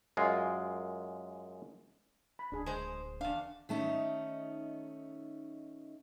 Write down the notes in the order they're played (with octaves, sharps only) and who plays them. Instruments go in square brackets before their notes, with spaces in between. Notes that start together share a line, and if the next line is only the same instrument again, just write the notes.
[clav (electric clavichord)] F#2 G#3 F4
[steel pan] B5
[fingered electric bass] D1 [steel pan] D4 G#4
[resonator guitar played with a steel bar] G#3 C5
[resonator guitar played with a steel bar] E2 F5 [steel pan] D4
[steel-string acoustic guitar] D#3 A3 C#4 D#4